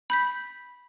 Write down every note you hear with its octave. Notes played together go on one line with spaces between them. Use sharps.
B5 G6 B6